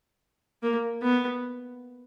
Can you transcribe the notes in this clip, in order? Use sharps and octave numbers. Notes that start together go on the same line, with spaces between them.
A#3
B3